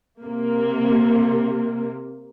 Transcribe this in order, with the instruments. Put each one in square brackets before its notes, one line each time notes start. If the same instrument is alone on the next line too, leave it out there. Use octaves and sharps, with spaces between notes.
[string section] C3 A#3